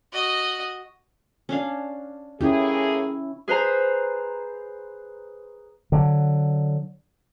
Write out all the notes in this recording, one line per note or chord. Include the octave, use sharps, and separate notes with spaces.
F#4 D#5
C#4 D4 F5
A2 A#3 C#4 E4 G4 G#4
G#4 B4 C5 A#5
D3 F#3